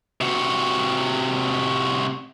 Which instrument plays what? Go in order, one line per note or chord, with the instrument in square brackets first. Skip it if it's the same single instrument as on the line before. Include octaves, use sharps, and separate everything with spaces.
[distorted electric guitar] C3 F#4